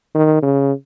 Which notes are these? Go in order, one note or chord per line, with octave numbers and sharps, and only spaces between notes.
D#3
C#3